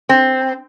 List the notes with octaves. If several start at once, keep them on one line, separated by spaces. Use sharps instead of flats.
C4